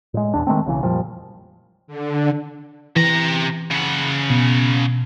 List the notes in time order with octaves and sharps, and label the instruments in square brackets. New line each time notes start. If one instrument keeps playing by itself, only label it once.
[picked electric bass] A2 G#3
E1 B1 E2 D4
D#3 G#3 A3 C4
B1 C#3 E3
F2 A#2 F3 G3
[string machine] D3
[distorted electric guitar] C3 A#5 [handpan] E3
[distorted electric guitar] C#3 F#5
[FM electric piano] B2